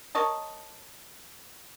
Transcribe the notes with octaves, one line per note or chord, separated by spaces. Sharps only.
A#4 C#5 D#5 A5